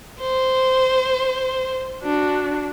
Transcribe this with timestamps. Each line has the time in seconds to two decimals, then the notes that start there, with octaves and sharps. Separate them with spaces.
0.20 C5
2.03 D4 F#4